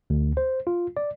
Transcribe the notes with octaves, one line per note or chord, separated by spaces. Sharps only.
D2
C5
F4
D5